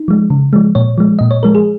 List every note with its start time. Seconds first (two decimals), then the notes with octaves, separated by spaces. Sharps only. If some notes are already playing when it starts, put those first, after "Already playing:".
Already playing: D#4
0.08 F3 G#3
0.30 C#3
0.53 F3 G#3
0.75 A#2 C#5
0.98 F3 G#3
1.19 A#2 D#5
1.31 C#5
1.43 F3 G#3 A#4
1.55 G#4